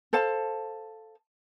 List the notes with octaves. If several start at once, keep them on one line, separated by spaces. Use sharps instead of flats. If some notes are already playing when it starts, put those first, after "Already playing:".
A4 C5 F5 A5